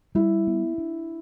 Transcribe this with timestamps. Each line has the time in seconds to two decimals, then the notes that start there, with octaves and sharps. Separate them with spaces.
0.15 G3 E4
0.47 B3
0.78 D4